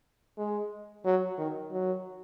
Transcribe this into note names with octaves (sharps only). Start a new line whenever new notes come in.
G#3
F#3
D#3
F#3